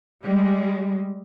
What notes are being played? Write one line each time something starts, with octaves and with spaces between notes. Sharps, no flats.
G3 G#3